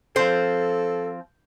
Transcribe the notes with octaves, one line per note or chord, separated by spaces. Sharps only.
F3 C4 A4 C5